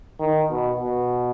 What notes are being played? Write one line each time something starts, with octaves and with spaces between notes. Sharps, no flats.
D#3
B2
B2